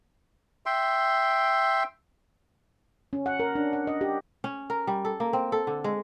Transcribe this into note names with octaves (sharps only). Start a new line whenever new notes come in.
E5 G5 C6
C#4
F#5
A#4
D4
F#5
D#5
G4
C#4
A#4
G3
A4
A#3
C4
A4
D3
G#3